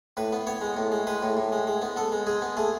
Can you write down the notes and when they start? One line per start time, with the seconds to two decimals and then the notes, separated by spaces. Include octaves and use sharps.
0.17 A2 B4
0.33 B3
0.47 B3 C#5
0.61 G#3
0.77 A2
0.92 G#3
1.07 G#3 B4
1.22 A2
1.37 A2
1.52 G#3
1.67 G#3
1.82 B3
1.96 B3 A4
2.12 G#3
2.27 G#3 G#4
2.42 B3
2.57 A3 G#4